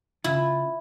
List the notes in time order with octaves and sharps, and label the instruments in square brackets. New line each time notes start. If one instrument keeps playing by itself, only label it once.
[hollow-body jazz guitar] C#3 F4 [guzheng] E4